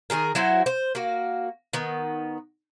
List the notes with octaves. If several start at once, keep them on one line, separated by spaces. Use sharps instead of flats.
D#3 F3 G#4 A#4
F#3 E4 F#4 C5
C5
A#3 F#4
D#3 B3